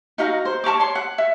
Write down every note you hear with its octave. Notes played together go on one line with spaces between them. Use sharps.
D#4 F#4 F5 A#5
C5
A5 A#5 C#6 D6
C#5 C6
F#5
E5